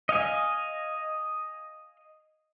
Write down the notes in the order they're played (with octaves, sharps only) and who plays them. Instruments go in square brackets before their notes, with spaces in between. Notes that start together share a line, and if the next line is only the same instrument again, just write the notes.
[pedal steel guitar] D#5 F5 G#5